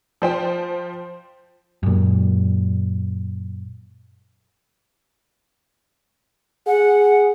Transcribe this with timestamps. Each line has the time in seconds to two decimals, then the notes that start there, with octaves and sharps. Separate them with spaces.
0.22 F3 C5 G5
1.83 F#2 A#2
6.67 G#4 F#5